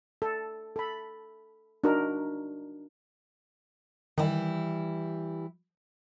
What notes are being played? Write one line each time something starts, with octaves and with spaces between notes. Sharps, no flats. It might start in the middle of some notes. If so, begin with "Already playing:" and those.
A4
A4 B5
D4 D#4 F#4 A#4
D#3 E3 G3 E4